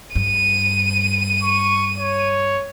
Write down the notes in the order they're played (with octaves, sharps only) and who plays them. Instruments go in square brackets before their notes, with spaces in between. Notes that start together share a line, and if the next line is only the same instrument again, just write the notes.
[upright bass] G2 [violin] D#7
[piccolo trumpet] C#6
C#5